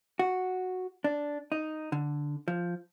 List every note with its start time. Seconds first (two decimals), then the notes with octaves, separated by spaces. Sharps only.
0.19 F#4
1.04 D4
1.52 D#4
1.92 D3
2.48 F3